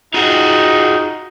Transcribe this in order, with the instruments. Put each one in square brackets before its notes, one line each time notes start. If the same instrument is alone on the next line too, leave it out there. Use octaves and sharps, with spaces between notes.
[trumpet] D#4 [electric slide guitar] F4 F#4 G#4